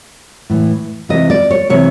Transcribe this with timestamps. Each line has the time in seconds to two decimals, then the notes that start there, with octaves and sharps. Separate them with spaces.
0.50 A2 E3
1.09 C3 E3 D#5
1.30 D5
1.51 C#5
1.70 C3 E3 C#5